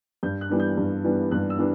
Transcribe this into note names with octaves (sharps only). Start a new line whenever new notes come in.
G2 G6
F#6
E3 G3 B3 D4
G6
G2
E3 G3 B3 D4
G2 F#6
E6
E3 G3 B3 D4